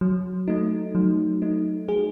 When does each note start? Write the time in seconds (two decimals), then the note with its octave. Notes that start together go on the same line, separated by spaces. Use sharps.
0.01 F#3
0.48 A3 D#4
0.95 F#3
1.42 A3 D#4
1.88 F#3 G#4